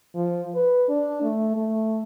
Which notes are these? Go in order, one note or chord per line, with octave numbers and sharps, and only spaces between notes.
F3
B4
D4
A3
A3